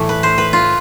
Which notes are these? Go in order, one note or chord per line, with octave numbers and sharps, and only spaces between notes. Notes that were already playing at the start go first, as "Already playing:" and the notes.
Already playing: A2 E3 A3
B4
C5
B4
F4